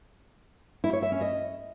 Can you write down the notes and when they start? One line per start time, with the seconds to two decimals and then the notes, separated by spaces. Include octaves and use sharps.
0.84 E4
0.93 C#5
1.02 E5
1.12 C#4
1.21 D#5